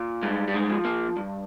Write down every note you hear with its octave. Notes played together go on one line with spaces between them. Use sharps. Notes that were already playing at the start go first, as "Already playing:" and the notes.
Already playing: A#2
G2 G#3
G3
G#3
F3
A#3
G2